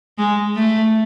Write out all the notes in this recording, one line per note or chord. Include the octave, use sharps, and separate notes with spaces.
G#3
A3